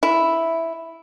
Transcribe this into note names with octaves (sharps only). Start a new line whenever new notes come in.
E4